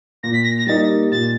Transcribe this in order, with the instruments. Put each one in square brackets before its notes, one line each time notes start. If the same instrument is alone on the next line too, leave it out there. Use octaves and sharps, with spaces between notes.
[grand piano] A#2 [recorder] A#6
[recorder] B6
A#6
A#6
[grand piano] G3 A#3 D#4 [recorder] A6
[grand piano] A#2 [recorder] A6